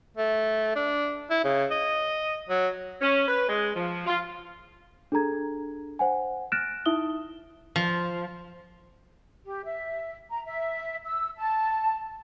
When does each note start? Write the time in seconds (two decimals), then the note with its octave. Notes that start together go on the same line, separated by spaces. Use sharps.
0.16 A3
0.75 D4
1.30 E4
1.44 C#3
1.71 D#5
2.49 F#3
3.01 C#4
3.28 B4
3.49 G#3
3.75 F3
4.06 F4
5.12 D4 G#4 A4 A#5 G#6
5.99 C5 F#5 G#5
6.52 F6 F#6 A6 A#6 D7 E7
6.86 D#4 E4 E5 D#6 G7
7.76 F3
9.45 G4
9.65 E5
10.30 A#5
10.45 E5
11.06 E6
11.37 A5